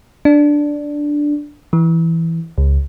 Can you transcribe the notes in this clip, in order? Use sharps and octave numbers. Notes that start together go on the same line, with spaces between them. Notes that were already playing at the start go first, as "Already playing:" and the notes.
D4
E3
C#2